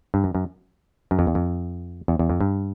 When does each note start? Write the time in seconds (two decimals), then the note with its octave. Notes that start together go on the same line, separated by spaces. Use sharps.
0.14 G2
0.24 F#2
0.35 F#2
1.11 F#2
1.19 F2
1.27 E2
1.35 F2
2.08 E2
2.19 E2
2.29 F2
2.41 G2